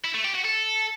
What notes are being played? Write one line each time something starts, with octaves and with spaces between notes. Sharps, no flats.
E4
A3
G4
F#4
A4